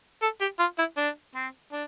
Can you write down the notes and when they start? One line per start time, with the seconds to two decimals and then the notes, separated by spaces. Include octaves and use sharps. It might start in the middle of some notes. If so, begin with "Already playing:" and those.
0.22 A4
0.41 G4
0.60 F4
0.78 E4
0.97 D4
1.35 C4
1.72 D4